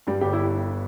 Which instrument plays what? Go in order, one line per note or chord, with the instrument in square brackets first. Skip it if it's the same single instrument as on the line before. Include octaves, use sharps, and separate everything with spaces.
[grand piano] G2 [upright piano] G3
[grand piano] G1 [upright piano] G4
[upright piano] E4